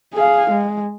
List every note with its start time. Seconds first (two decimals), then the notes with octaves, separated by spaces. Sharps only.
0.14 G#4 F5
0.50 G#3